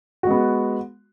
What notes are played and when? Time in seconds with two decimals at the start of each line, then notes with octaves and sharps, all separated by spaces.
0.23 F#4
0.27 G#3
0.31 B3